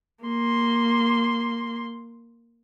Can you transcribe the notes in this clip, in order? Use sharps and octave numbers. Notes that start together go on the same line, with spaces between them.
A#3 C6